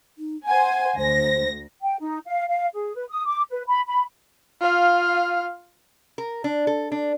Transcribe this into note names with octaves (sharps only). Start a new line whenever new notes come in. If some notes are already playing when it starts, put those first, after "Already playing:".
D#4
C5 F#5 G#5
D2 C5 A#6
G5
D#4
F5
F5
G#4
B4
D#6
D6
B4
B5
B5
F4 F5
A#4
D4
A4
D4